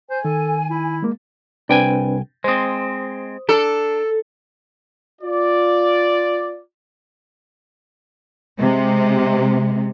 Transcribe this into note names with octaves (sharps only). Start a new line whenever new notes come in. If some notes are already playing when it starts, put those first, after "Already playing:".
C5 G#5
D#3 A4
E4
G#3 A#3
C2 C4 D4 B4 G5 G#5
G#3 C4 C5 D#6
D4 A4
F4 D5
C3 G#3